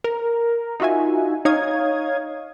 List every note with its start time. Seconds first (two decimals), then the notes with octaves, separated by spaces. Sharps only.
0.04 A#4
0.80 D#4 F4 F#4 E5 G#5
1.45 D#4 C#5 F5 D#6 G#6